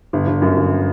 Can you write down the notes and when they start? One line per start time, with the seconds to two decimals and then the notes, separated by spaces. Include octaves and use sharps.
0.13 G1
0.27 G1
0.42 F#2
0.57 G1